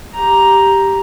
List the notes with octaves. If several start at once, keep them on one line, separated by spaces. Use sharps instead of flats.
G4 A#5